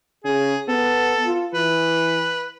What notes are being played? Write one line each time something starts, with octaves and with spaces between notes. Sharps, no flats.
C#3 G#4
B3 A4
F4
E3 B4